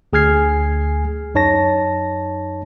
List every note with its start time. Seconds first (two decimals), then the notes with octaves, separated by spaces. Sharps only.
0.13 D2 G#4 G#5 F6 G#6 C7
1.35 F#2 D#4 C#5 A5 A#6